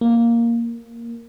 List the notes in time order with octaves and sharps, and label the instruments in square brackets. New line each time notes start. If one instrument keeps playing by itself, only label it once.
[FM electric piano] A#3